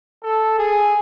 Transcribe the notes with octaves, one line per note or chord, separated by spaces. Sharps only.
A4
G#4